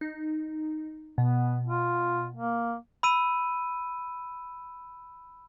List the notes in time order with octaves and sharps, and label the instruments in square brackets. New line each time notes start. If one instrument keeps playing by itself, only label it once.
[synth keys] D#4
[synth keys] B2 [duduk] B3
[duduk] F4
A#3
[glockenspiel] B5 E6 D#7